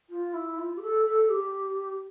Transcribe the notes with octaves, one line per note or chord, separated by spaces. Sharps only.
F4
E4
F4
G4
A4
A4
G4